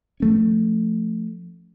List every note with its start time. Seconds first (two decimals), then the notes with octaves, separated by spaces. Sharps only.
0.20 F3 A3 C#4